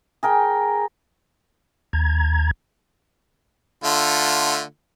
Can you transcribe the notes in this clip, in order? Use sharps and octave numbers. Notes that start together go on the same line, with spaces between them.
G#4 A#4 G5
D#2 A#5 G#6
D3 A3 F4